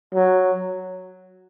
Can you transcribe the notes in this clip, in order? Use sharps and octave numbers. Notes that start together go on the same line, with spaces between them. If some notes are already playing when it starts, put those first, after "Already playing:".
F#3